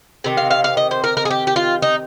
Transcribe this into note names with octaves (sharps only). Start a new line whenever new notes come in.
C3 D#3
F5
F5
F5
D#5
C5
A#4
A#4
G#4
G4
G4
F4
D#4